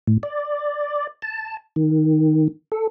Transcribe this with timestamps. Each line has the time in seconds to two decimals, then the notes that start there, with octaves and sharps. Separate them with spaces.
0.07 A2
0.23 D5
1.22 A5
1.76 D#3
2.72 A4